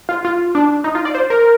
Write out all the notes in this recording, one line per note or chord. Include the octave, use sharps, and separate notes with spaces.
F4
F4
D4
D#4
F4
D5
C5
A#4